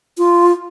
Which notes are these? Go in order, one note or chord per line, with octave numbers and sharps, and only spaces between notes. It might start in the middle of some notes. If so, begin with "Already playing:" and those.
F4